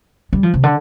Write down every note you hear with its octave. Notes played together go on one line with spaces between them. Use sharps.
G3
F3
C3
D3